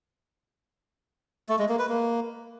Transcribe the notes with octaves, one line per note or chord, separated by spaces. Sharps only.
A3
G#3
A#3
B4
A#3